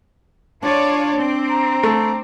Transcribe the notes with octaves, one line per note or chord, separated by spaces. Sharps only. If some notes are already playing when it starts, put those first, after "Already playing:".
D4 F4 C#5 D5 A5
C4
A#5
A3